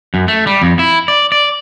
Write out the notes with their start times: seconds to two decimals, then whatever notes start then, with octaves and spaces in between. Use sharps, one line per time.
0.14 F#2
0.28 A3
0.47 G3
0.62 F2
0.79 E4
1.08 D5
1.32 D5